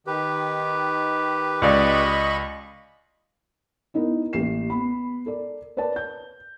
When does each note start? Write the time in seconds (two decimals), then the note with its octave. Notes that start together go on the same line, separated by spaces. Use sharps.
0.07 D#3 G4 B4
1.62 C#2 D5 D#5 B5 C#6
3.94 B3 D#4 E4 A#4
4.33 A1 A#3 G4 C7 E7
4.70 B3 B5
5.26 A4 A#4 D5
5.77 A#4 B4 C#5 D5 A5
5.96 G6